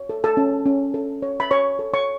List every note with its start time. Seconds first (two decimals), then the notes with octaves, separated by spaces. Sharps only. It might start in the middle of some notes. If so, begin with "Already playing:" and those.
Already playing: C#5
0.09 A4
0.24 A4 A5
0.37 C#4
0.66 C#4
0.94 A4
1.22 C#5
1.40 B5
1.51 C#5 C#6
1.79 A4
1.94 C#5 C#6